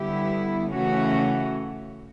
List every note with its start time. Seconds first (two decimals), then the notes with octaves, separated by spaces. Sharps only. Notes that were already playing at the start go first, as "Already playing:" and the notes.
Already playing: D3 G3 B3 E4 G4
0.71 C#3 E3 A3 C#4 F#4